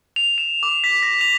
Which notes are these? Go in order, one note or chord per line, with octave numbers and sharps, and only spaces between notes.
F7
E7
D6
B6
A#6
F7